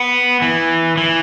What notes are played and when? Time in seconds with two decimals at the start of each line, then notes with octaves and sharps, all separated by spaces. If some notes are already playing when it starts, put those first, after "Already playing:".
Already playing: B3
0.42 E3
0.97 E3